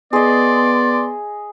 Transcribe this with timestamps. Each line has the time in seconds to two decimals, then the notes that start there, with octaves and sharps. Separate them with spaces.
0.13 B3 G#4 D5 D#5 C6